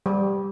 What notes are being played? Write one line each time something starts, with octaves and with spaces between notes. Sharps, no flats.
G3